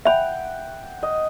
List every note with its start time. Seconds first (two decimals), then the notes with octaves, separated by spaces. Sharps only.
0.05 E5 F#5 G5 B5
1.03 D#5